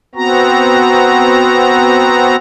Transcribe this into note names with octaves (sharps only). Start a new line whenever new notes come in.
B3 C4 F#4 A#5